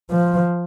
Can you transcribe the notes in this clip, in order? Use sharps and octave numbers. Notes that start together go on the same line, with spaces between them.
F3